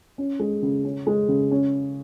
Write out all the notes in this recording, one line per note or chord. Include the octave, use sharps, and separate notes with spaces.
C#4
G#3
C#3
C#4
G#3
C#3
C#4